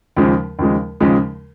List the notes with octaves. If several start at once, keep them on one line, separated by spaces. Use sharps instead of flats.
D#2 C#3 F3 G#3
D#2 C#3 F3 G#3
D#2 C#3 F3 G#3